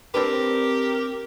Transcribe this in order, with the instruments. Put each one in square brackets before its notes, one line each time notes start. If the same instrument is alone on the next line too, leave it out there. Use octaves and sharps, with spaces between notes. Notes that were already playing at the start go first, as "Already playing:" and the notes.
[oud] C4 D4 B4 [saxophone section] G4 A#4